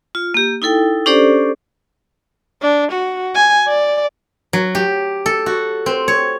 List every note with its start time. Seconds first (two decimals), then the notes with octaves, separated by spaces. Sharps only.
0.15 F4
0.34 A#3 G4
0.62 D#4 E4 A4 G5
1.06 C#4 D4 G4 A4 C5 D5
2.62 D4
2.92 F#4
3.35 G#5
3.68 D5
4.53 F#3
4.75 G4
5.26 A4
5.46 F#4
5.86 C4
6.08 C#5